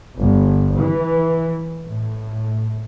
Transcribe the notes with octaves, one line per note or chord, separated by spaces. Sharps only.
G1
E3
A2